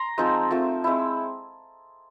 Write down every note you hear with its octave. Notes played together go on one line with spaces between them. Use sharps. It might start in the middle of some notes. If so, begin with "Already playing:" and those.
Already playing: A#5 C6
F3 G#3 C4 D#4
F3 A3 C4
G#3 C4 E4